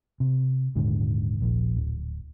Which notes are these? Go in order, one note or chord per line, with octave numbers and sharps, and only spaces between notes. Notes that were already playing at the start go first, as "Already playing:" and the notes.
C3
D#1 G#2 D3
D#1 A#1
D1